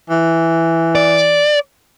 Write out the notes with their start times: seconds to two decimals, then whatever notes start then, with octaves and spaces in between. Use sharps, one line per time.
0.10 E3
0.95 D5